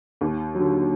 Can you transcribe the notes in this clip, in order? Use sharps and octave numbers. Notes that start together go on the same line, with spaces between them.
D#2
D3 F#3